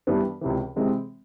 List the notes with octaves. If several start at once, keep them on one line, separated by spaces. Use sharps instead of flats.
G2 E3 G3 B3 D4
C#2 C3 E3
C3 E3 G#3 C4